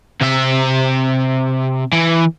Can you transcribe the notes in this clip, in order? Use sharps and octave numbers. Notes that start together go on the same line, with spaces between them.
C3 E5
E3